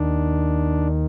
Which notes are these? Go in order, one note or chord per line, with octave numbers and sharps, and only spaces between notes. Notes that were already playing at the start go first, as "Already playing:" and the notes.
Already playing: D#2 D#3 D4